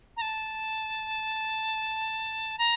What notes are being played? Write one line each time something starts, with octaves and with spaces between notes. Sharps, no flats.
A#5
A5
A#5